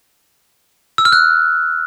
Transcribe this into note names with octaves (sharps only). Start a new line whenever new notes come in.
E6
F6
F#6